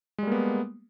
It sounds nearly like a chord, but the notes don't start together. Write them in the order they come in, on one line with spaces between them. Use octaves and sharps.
G#3 G3 A#3 B3